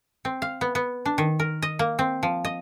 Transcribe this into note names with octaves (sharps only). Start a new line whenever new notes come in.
C4
F5
B3
B3
D4
D#3
A#4
D#5
A#3
C4
F3
D#5